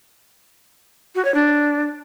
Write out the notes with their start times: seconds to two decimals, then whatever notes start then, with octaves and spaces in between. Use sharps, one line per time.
1.15 F#4
1.25 C#5
1.34 D4